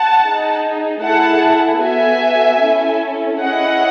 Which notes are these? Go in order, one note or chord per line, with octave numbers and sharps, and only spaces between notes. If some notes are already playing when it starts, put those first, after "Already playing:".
Already playing: F#5 A5
D#4 G#4
A3 E4 G#4 F#5 A5
B3 F#4 A4 E5 G#5
C#4 E4 A4
C#4 E4 G#4 D#5 F#5